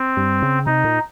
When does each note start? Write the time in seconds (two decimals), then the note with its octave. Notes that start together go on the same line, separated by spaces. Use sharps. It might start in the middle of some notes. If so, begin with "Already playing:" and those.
Already playing: C4
0.17 G2
0.42 C#3
0.66 C3 D#4
0.85 A#2